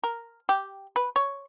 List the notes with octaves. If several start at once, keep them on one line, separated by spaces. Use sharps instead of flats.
A#4
G4
B4
C#5